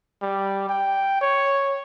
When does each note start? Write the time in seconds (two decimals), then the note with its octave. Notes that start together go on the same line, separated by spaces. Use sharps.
0.22 G3
0.69 G5
1.21 C#5